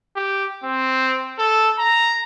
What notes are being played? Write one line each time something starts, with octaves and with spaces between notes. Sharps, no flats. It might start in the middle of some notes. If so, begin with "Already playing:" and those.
G4
C4
A4
A#5